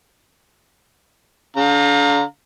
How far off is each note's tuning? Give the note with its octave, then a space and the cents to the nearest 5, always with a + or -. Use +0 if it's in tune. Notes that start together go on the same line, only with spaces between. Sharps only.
D3 -40 F5 +30 A#5 -15